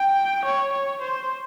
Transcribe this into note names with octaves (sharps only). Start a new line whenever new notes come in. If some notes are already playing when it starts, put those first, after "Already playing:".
Already playing: G5
C#5
C#5
C5